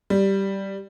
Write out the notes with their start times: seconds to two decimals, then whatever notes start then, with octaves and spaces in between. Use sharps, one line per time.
0.10 G3